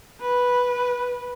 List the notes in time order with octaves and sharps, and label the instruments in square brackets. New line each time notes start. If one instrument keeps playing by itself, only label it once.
[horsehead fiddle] B4